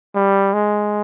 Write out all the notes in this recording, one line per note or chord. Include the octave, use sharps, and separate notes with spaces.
G3
G#3